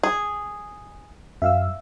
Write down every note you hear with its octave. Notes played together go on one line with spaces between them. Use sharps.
G#4
F#2 E5 F5 E6